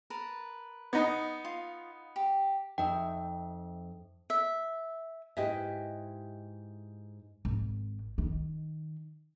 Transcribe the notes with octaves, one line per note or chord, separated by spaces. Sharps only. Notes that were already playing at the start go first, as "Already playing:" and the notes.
A#4 B4 A5
B3 D#4
F4
G4
F2 D#4 E5 G5
E5
G#2 E4 G4 B4 D#5 E5
G#1
D#3